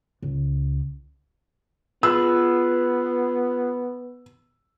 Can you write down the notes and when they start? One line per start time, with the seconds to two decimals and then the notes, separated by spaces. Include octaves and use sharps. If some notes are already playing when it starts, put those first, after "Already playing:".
0.22 C#2
2.03 B3 F4 G#4 B4 E6